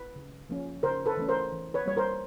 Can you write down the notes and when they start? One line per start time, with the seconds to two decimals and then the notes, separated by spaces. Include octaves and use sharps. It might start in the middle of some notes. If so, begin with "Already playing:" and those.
Already playing: B4
0.16 C#3
0.49 F3 A#3 C#4
0.83 C#3 A#4 C5
1.06 A4 B4
1.17 E3 A3 C#4
1.29 A#4 C5
1.52 E3
1.74 B4 C#5
1.86 G3 A#3 C#5
1.97 A#4 C5